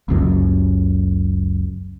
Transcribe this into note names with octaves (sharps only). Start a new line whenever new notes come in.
F#1 C#2 F#2